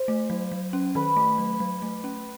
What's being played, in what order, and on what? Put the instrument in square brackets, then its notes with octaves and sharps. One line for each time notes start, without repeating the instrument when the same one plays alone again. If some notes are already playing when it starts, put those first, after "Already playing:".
Already playing: [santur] C5
[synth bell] A3
F#3
F#3
C#4
[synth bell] D#3 [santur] B4
[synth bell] A3
F#3
F#3
A3
C#4